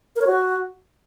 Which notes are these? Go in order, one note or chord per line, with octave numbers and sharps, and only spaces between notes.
A#4
C#5
F#4